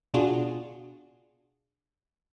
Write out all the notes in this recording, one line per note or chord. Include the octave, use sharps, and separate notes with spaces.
B2 D4 F4 F#4 G#4